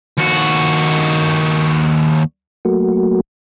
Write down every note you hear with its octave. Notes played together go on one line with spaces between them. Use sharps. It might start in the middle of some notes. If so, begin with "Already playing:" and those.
D#2 F#4
F#3 A3 A#3 F#4